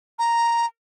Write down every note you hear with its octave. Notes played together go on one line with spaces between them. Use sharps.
A#5